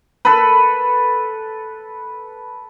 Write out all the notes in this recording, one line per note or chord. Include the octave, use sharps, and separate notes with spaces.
A4 B4